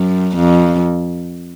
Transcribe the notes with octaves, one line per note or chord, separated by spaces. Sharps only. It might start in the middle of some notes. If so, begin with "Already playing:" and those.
Already playing: F#2
F2